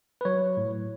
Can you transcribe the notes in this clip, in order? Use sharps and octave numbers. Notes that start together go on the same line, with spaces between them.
B4
F#3 C#5
A2